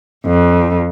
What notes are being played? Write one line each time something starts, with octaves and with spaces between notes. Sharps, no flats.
F2